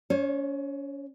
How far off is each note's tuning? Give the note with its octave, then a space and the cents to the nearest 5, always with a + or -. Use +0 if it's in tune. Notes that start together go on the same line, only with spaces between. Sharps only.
C#4 +30 C#5 -35